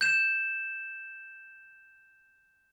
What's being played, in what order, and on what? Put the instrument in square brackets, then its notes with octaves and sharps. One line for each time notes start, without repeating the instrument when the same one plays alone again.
[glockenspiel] G6 E7